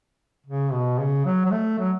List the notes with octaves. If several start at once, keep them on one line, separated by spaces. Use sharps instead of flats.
C#3
B2
C#3
F#3
F#3
A3
F#3